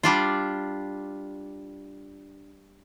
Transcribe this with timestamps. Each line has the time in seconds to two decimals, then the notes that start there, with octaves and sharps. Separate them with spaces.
0.03 G3 D4 F4